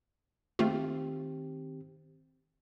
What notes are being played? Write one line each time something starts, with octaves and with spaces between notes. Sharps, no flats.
D#3 A3 C4 F4 G4